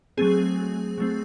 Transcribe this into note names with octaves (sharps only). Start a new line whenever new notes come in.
F#3 A3 C4 G#4
F#3 A3 C4